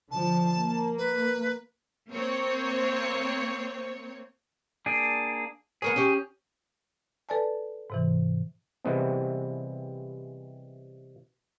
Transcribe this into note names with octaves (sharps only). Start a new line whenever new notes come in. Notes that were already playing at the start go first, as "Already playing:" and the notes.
D3 F3 A5
A#3
B4
A#3 C4 C#5
A#3 D4 G#4
B3 G#4 A#4 C#5
C#4 G4
A4 B4 D5 G#5 A5
G#2 C3 E3
C3 E3 G3 G#3 B3 C4